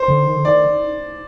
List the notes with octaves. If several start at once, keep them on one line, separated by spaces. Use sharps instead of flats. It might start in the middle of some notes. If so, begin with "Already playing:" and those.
Already playing: C5
D3
D#3
D3
D#3 D5